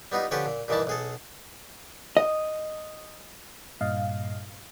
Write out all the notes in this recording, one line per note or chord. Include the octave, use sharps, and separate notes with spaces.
G3 B3 D#4 F4
D3 F3 C#4 G4 A4 B4
A#2
G2 A#2 D#3 E3 G3 A5
B1 G#4 A4
D#5
G2 A#2 D#5 F5